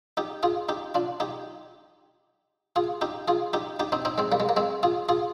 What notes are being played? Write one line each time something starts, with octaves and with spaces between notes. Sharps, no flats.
D#4 G4
F4 G#4
D#4 G4
D4 F4
D#4 G4
F4 G#4
D#4 G4
F4 G#4
D#4 G4
D#4 G4
C4 D#4
C4 D#4
G#3 C4
G3 A#3
G#3
A#3
G#3 C4
F4 G#4
F4 G#4